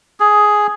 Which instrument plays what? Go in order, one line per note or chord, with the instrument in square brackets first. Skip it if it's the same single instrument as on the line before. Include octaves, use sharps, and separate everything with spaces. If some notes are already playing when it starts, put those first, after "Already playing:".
[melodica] G#4